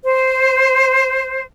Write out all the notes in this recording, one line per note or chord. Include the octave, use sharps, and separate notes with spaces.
C5